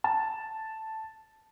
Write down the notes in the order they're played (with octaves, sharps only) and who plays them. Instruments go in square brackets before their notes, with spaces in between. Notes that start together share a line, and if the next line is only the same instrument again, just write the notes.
[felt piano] A5